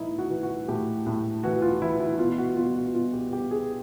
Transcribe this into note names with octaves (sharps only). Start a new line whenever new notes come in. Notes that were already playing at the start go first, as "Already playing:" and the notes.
Already playing: A2 E3 D#4 E4
F#4
E3
F#4
A2 G4
A2
E3 F#4
F4
E3 E4
E4
B2 F4
F#4
B2 F4
F#4
B2 F4
G4
B2 G4
G#4